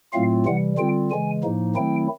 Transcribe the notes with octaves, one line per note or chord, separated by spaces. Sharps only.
A2 F#3 A3 C4 F4 F5
C3 E3 G3 F#5
D3 G3 C4 F4 G5
C#3 E3 G#3 G#5
A2 F3 A#3 D#4
D#3 F#3 A3 C4 E4 G5